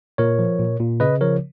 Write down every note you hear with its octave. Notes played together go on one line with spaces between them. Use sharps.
A#2 A#4 C#5
F3
A#2
A#2
C#3 B4 D#5
F3 A#4 C#5